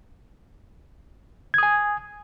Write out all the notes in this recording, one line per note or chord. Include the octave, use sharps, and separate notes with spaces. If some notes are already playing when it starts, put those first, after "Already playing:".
G#5 D#6 G#6